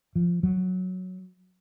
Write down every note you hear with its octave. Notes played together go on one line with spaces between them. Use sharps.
F3
F#3